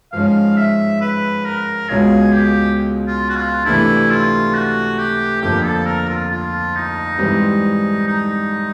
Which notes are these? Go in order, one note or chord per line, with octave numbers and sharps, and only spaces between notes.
G#2 F3 G#3 C#4 F5
E5
B4
A#4
C#2 B2 G#3 C#4 F4 G#4
G4
F4
F#4
F4
C3 E3 A3 D4 E4
F4
F#4
G4
F2 D3 F3 A#3 G4
A4
A#4
F4
F4
D#4
G#2 E3 G3 C4
D#4